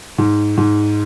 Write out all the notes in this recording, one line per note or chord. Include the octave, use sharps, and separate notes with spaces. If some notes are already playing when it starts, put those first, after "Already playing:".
G#2
G#2